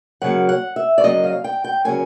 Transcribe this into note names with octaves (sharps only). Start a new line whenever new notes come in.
F#2 C#3 F#3 A#3 F#5
F#5
E5
D5
F#2 C#3 F#3 A#3 D#5
F5
G5
G5
C#3 F#3 A#3 G#5